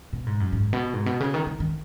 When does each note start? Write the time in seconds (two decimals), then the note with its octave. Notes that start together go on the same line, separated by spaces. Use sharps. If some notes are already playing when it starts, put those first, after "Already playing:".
0.13 B2
0.27 G#2
0.40 F#2
0.53 G#2
0.73 B2
0.94 G#2
1.06 B2
1.20 C#3
1.34 D#3
1.46 C#3
1.60 D#3